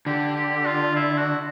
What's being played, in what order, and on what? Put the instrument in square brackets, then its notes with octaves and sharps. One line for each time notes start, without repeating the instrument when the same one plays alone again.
[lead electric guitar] D3 [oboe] G4
[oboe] G4
F4
E4
F#4